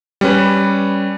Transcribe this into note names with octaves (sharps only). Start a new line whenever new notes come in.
G3 C#4 B4